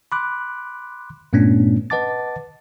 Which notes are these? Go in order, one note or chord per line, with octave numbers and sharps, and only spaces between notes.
B5 C6 D6 F#6
G2 A#2 A3 B3 C#4 D4
B4 D#5 F#5 A5 D6 A6